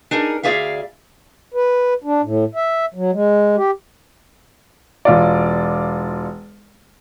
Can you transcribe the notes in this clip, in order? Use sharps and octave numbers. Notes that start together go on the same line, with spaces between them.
D4 D#4 G#4 A#4
D2 E3 G#4 D5 E5 F5
B4
D4
A2
E5
F#3
G#3
G4
E1 F4 D5